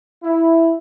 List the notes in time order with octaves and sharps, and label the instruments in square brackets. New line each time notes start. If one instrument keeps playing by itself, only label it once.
[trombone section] E4